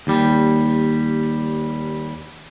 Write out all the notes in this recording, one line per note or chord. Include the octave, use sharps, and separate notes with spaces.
D#2 G3